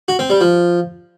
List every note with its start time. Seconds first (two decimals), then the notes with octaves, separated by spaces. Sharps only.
0.08 F#4
0.19 C4
0.30 G3
0.41 F3